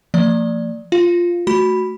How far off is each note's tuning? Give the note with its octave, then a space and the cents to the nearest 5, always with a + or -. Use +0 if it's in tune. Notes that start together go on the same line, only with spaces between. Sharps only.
F3 -10 A#3 -40 D5 +0
F4 +0 F5 +0
A3 +0 F#4 +0 B5 +0